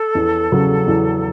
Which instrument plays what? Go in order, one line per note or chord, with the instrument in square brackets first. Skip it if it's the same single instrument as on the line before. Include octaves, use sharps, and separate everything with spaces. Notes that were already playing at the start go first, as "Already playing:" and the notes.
Already playing: [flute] A4
[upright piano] E2
C#3 F#3
E2